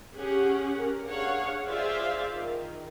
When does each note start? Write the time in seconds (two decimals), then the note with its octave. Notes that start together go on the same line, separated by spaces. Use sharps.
0.15 C#4 G4 G#4 F#5
0.76 A#4
1.06 D4 G#4 C#5 F5 F#5
1.67 F4 G#4 C5 D5 E5 F5
2.36 D#3